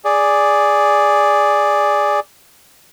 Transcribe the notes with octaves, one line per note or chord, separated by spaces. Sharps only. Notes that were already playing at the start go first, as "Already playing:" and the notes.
G#4 D5